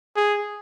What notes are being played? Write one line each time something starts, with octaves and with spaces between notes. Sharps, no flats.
G#4